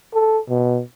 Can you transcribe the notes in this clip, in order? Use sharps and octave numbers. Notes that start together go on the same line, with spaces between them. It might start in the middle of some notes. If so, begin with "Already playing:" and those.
A4
B2